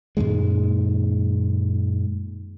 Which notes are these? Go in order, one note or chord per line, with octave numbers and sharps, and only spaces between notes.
F#2 A#2 D#3 G#3